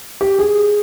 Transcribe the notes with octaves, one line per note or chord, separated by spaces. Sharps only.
G4
G#4